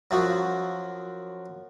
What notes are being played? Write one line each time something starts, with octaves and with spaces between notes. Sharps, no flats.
F#2 F3 F#3